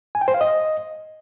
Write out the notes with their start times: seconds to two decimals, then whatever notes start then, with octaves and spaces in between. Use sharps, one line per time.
0.15 G#5
0.21 G5
0.28 C5
0.34 F5
0.41 D#5